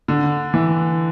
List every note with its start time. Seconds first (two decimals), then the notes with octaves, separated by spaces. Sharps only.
0.08 D3
0.54 E3